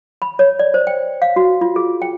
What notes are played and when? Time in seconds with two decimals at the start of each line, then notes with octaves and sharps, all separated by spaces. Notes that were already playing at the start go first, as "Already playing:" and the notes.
0.22 B5
0.39 C#5
0.59 D5
0.74 C5
0.87 G5
1.22 F5
1.36 F#4
1.61 F4
1.76 G#4
2.02 G5